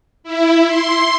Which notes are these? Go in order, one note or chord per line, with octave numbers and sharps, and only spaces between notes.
E4
C6